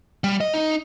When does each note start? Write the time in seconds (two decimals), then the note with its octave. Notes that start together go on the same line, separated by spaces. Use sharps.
0.24 G3
0.41 D#5
0.54 D#4